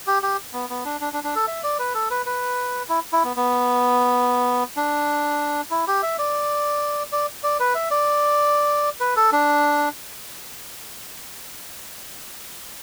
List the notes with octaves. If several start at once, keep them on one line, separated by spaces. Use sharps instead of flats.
G4
G4
B3
B3
D4
D4
D4
D4
A4
E5
D5
B4
A4
B4
B4
E4
E4
B3
B3
D4
E4
G4
E5
D5
D5
D5
B4
E5
D5
B4
A4
D4